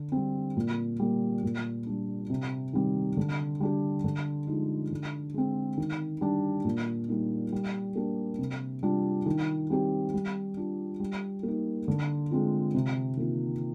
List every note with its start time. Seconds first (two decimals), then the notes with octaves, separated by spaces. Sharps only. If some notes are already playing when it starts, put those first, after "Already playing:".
Already playing: D3
0.12 G3 C4
0.57 A#2
0.99 G3 A#3
1.43 A#2
1.86 G3 D4
2.30 C3
2.73 D#3 G3 C4
3.17 D3
3.60 G3 D4 G4
4.04 D3
4.47 F3 G#3 D#4
4.91 D3
5.34 G#3 C4
5.78 D#3
6.21 G3 D4
6.65 A#2
7.09 G3 A#3 D#4
7.52 G3
7.95 A#3 D4 G4
8.39 C3
8.83 G3 D4 F4
9.26 D#3
9.70 G3 C4 G4
10.14 G3
10.57 D4 F4
11.00 G3
11.43 A#3 D#4
11.88 D3
12.31 G#3 C4 F4
12.74 C3
13.17 D#3 A#3 F4